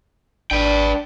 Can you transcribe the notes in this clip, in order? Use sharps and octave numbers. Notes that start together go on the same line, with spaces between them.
G#1 D4 B4 G5